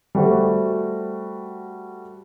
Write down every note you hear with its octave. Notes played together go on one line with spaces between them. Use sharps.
G3 A3 F#4 C5